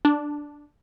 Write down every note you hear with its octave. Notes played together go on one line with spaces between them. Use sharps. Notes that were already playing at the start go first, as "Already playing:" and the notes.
D4